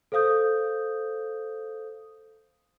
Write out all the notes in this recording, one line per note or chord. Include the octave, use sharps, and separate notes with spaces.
A4 C5 F5 D#6 G6